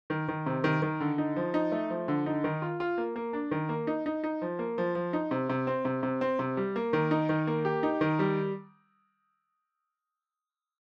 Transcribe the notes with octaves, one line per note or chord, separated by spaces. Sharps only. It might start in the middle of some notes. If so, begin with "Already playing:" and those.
D#3
D#3
C3
D#3
D#3
D3
D#4
F3
D#4
A3
F3
D3
D#4
D#3
F4
F4
A#3
A#3
D4
D#3
A#3
D#4
D#4
D#4
F3
A#3
F3
F3
D#4
C3
C3
C4
C3
C3
C4
C3
G3
A#3
D#3
D#4
D#3
A#3
G4
D#4
D#3
G3